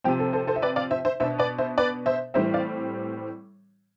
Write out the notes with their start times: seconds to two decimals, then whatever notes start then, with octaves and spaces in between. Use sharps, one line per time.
0.04 C3 F3 C4 G4
0.19 A4
0.33 A4 C5
0.47 A4 C5
0.56 E5
0.62 B4 D5
0.76 D5 F5
0.91 C5 E5
1.05 C5 E5
1.20 B2 B3 D4 C5 E5
1.39 B4 D5
1.58 C5 E5
1.78 B4 D5
2.06 C5 E5
2.34 A2 E3 G3 C4 C5 E5
2.54 D5 F5